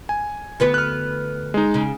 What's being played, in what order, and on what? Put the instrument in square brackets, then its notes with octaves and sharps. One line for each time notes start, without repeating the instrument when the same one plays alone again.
[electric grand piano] G#5
[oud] D2 B3 B4
[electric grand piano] F6 F#6
G#3 D#4
[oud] C#3